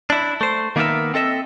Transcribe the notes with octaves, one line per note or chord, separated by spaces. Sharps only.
D4 E4
A3 C5
D#3 A#3 B3 D#4 A#4 E5
C4 A4 D#5 E5